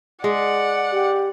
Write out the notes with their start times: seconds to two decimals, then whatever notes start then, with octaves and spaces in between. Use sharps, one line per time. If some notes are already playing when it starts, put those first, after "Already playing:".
0.24 G#3 D5 F#5
0.92 G4